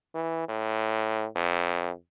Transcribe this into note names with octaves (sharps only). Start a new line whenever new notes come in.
E3
A2
F2